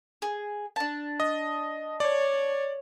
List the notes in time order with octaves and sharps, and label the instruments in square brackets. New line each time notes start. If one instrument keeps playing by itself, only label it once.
[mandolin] G#4
D4 A5
[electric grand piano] D#5
[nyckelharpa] C#5 [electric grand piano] D5